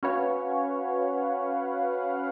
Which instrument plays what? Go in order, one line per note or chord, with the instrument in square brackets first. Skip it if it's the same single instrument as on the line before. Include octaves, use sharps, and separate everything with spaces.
[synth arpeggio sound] C#4 F#4 B4 C#5 F5 F#5